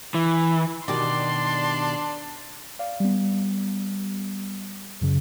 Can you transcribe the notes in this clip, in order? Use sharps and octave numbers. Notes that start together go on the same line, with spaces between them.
E3
B2 D#3 D4 G4 D5 C6
D5 F5
G3 B3
F#2 C#3